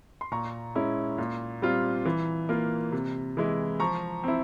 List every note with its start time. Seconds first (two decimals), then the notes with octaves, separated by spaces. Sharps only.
0.21 C6
0.32 A#2 A#5 C#6
0.75 G#3 C#4 E4
1.18 A#2
1.62 G3 C4 F4
2.05 E3
2.49 A#3 F4
2.92 C3
3.37 E3 G#3 E4
3.80 F3 A#5 C#6
4.24 C4 E4